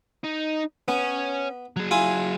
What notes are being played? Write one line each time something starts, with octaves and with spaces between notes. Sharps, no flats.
D#4
B3 C#4
F#3 G#4
E4 F4 G#5